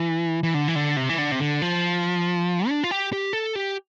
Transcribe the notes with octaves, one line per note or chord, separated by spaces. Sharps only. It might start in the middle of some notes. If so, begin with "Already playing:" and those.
Already playing: E3
E3
D3
E3
D3
C3
E3
D3
C3
D3
F3
D4
F4
G4
G4
A4
G4